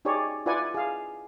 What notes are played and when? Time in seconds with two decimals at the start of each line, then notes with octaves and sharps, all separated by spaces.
0.05 D#4 G4 G#4 C#5 D5
0.46 E4 F4 B4 D5 F#5 G#5
0.74 G#4 F5